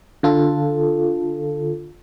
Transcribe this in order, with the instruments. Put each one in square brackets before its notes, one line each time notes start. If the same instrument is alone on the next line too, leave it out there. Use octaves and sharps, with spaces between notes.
[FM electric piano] D3 F4 A4